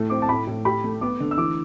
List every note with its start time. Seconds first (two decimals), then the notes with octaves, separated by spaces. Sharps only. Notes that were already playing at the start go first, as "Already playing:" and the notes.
Already playing: A2 A3
0.10 C4 D6
0.22 A5
0.29 A2 B5
0.47 A2
0.65 G4 B5
0.84 A3
1.01 B3 D6
1.20 D3
1.31 E6
1.38 E3 D6